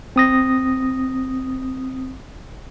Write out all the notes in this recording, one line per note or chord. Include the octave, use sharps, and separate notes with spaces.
C4 D#6 A#6